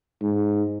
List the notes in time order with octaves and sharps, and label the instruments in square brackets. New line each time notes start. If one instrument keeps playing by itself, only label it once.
[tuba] G#2